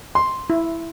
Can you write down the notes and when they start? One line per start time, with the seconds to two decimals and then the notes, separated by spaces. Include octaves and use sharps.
0.15 C6
0.50 E4